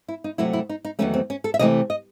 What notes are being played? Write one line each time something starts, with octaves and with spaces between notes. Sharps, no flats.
E4
D#4
C3 F#3 A3 E4
E4
D#4
D#4
E2 D#3 F#3 A3 C#4
C4
C#4
A4
E5
C3 E3 A3 D#5
D#5